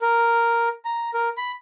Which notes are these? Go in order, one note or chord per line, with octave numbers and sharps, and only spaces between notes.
A#4
A#5
A#4
B5